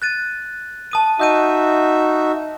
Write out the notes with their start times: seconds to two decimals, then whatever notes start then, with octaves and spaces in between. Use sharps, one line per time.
0.02 F#6 A6 D#7
0.91 A5 D#6 D#7
1.19 D#4 F#4 E5 D#6 G6 D#7